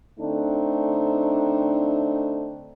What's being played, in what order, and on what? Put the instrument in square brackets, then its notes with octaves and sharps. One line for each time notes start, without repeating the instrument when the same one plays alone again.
[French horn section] D3 A3 C4 D4 D#4